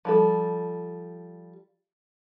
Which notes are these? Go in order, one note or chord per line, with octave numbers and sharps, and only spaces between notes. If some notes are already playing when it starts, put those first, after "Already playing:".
F3 G3 A4